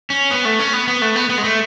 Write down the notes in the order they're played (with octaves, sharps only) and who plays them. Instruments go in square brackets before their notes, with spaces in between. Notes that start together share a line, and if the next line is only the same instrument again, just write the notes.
[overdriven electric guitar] C#4
B3
A3
C#4
B3
B3
A3
B3
B3
G#3
A3